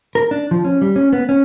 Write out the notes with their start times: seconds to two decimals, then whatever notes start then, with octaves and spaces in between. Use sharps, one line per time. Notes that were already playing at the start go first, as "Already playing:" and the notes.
0.15 A#4
0.31 D4
0.51 F3
0.64 C#4
0.81 G3
0.96 C#4
1.13 B3
1.29 C#4